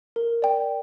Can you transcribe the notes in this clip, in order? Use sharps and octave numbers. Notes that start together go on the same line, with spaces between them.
A#4
D5 G5